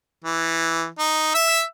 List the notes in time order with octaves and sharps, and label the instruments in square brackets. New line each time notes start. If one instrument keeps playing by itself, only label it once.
[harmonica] E3
D#4
E5 E6